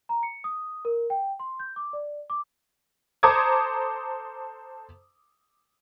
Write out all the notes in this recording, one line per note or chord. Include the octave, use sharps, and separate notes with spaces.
A#5
C#7
D#6
A#4
G5
C6
G6
D6
D5
D6
A4 C5 A#5 D6 D#6 G#6